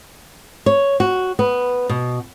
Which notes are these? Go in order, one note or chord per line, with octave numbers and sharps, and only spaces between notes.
C#5
F#4
B3
B2